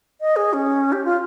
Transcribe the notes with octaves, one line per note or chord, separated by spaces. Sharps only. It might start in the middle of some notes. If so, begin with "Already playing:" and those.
D#5
G#4
C#4
G4
F4